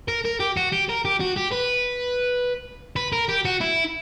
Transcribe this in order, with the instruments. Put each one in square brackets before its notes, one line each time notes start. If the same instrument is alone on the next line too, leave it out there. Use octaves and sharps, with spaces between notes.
[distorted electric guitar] A#4
A#4
G4
F#4
G4
A#4
G4
F#4
G4
B4
B4
A#4
G4
F#4
E4